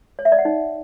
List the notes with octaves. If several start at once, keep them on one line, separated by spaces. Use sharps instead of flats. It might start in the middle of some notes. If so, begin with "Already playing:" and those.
C#5
E5
D5
F#5
D#4